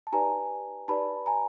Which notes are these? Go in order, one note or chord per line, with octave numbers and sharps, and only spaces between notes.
A5
D#4 G4 B4 D5 G#5 A#5
D#4 G4 B4 D5 A5 B5
G#5 A#5